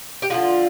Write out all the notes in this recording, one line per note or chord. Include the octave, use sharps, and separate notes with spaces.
G4
D3 F3 G#3 F4